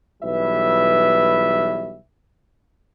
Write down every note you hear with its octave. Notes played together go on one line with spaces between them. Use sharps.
B1 E3 G3 B4 E5